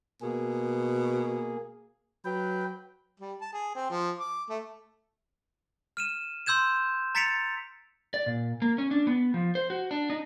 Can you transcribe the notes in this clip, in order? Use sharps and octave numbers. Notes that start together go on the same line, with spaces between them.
B2 A#3 G#4
F#3 B4 G5
G3
A5
G#4
C4
F3
D6
A3
F6 D#7 E7
C6 E6 G6 G#6 E7
A#5 A6 B6 C#7 D7 F7
D5
A#2
A#3
C#4
D4
B3
F3
C5
F#4
D4
D#4